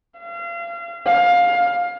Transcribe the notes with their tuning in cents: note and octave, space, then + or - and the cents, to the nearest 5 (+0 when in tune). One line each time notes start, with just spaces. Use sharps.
F5 -35
F5 +20